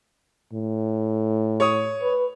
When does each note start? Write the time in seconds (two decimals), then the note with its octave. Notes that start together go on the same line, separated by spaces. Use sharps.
0.54 A2
1.60 C#5 C#6 D#6
2.02 B4